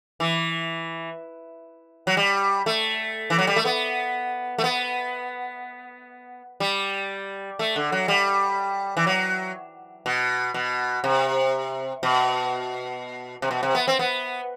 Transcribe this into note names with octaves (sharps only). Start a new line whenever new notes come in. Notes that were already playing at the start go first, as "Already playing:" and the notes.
E3
F#3
G3
A3
E3
F#3
G3
A3
B3
A3
B3
G3
A3
D3
F#3
G3
E3
F#3
B2
B2
C3
B2
C3
B2
C3
B3
C4
B3